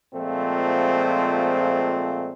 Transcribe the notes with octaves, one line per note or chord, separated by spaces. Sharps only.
A#2 F3 G#3 A3 C4